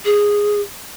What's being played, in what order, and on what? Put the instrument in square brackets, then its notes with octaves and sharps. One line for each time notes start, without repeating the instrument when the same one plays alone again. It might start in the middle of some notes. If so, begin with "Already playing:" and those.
[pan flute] G#4